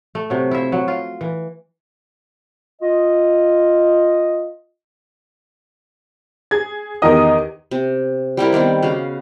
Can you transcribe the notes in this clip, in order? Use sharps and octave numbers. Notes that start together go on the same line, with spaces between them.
A3
C3 F#3
E4 F4 E5
F#3
F4
E3
F4 D#5
G#4 G#6
E2 D#3 G4 A#4 D#5 D#6
C3
G3 C4 E4 A#4
D#3 G3 B3 C4
C#3 F#4 F5